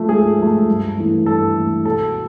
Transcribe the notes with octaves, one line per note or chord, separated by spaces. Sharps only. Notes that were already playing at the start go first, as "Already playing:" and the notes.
Already playing: F3 A3
G#2 G#4
F3 A3
G2
E3 A3
G2 A4
E3 A3
B2 A4